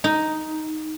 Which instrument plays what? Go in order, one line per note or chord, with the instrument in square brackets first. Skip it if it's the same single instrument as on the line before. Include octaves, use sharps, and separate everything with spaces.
[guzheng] D#4